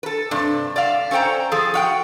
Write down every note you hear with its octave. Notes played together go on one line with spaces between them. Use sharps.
A4 B4
G2 C3 D4
D5 E5 F5
C#4 A4 C5 G5 A#5
F3 G#4 A4
F#4 F5 G5